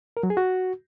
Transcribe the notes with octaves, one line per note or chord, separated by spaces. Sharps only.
A#4
F#3
G#4
F#4